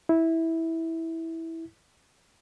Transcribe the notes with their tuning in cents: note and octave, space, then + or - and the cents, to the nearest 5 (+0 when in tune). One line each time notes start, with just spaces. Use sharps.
E4 -10